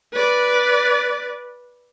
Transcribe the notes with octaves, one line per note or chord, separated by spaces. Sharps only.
B4 D5